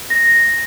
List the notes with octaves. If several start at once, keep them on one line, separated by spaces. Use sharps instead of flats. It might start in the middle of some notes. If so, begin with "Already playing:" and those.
A#6